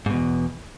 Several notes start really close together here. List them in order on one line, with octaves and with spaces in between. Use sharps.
G#2 B2 E2